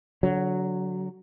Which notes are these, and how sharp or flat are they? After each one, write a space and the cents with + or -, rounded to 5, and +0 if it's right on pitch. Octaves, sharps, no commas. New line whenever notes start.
D3 -30 F#3 +0